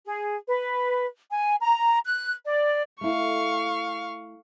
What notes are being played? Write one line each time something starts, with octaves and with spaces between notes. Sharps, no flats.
G#4
B4
G#5
A#5
F#6
D5
A3 E4 F5 C#6